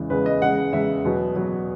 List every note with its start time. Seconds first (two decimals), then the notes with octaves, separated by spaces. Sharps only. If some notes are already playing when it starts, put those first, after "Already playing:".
Already playing: E2 C#3 E3 G#3
0.10 E2 C#3 E3 G#3 B4
0.26 D#5
0.42 E2 C#3 G#3 F#5
0.73 E2 C#3 G#3 E5
1.04 E2 B2 F#3
1.36 E2 B2 F#3